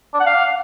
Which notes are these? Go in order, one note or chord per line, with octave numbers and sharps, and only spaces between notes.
D4
F#5
F5